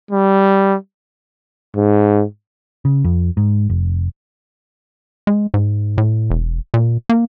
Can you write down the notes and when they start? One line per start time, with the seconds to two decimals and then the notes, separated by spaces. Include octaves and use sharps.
0.11 G3
1.76 G#2
2.85 C#3
3.04 F2
3.37 G#2
3.70 F1
5.27 G#3
5.54 G#2
5.98 A2
6.30 E1
6.74 A#2
7.09 A#3